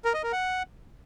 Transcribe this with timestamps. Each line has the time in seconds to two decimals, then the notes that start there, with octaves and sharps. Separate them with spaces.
0.05 A#4
0.14 D#5
0.23 A#4
0.33 F#5